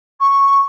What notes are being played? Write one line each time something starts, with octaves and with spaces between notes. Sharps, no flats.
C#6